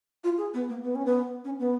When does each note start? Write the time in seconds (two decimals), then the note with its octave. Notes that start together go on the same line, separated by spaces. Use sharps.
0.24 F4
0.38 G#4
0.54 B3
0.69 A#3
0.83 B3
0.95 C#4
1.06 B3
1.44 C#4
1.59 B3